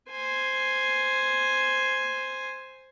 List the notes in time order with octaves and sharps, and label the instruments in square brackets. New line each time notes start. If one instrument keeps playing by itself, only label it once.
[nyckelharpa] C5 G#5